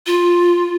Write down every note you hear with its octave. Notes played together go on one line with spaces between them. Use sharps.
F4